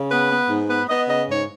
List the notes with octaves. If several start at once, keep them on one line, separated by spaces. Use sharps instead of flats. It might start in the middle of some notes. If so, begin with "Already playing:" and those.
Already playing: C#3
B3 B4
B3
G#2
B3 B4
B3 D#5
C#3 D#5
G#2 C#5